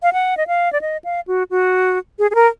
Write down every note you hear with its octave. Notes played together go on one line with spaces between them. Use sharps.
F5
F#5
D#5
F5
D5
D#5
F5
F#4
F#4
G#4
G#4
A#4